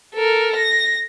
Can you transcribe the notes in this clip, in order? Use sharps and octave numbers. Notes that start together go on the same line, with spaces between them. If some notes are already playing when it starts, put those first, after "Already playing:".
A4 A#4
A#6